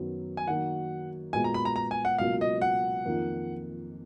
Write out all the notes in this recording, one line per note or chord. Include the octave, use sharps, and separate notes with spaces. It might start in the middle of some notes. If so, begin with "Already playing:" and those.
Already playing: F#2 D#3 F#3 B3
G#5
D#3 F#3 A#3 D#4 F#4 F#5
A#2 G#3 B3 F#4 G#5
A#5
B5
A#5
A#5
G#5
F#5
C#2 B2 F#3 A#3 F5
D#5
F#5
F2 D#3 A#3 F4